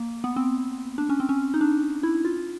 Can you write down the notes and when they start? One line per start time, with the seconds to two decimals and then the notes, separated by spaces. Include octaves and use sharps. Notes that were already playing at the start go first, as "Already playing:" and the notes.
Already playing: A#3
0.24 B3
0.36 C4
0.98 D4
1.09 C#4
1.20 C4
1.29 C#4
1.54 D#4
1.61 D4
2.03 E4
2.25 F4